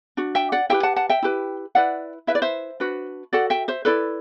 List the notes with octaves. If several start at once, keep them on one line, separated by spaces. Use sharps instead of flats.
D4 F#4
E5 G5
D5 F#5
E4 G4 B4 E5 G5
F#5 A5
F#5 A5
E5 G5
E4 G4 B4
E4 B4 D5 F#5
E4 B4 E5
D5
C5 E5
D4 F#4 B4
F#4 A4 D5 F#5
E5 G5
C5 E5
E4 A4 B4 D5